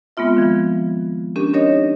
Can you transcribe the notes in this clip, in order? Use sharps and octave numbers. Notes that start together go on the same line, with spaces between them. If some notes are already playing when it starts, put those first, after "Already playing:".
G#3 B3 C4 F4 E5
D#3 F3
C#4 D4 G4 A#4
D4 D#4 G4 A#4 C#5 D#5